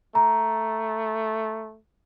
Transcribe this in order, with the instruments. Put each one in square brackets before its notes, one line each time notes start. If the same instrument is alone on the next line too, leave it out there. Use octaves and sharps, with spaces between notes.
[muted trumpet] A3 [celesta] A#5